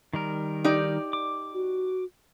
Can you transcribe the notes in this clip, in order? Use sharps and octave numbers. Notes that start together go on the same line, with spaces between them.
D#3 G3 A#4
D#4 G4 D5
D6
F#4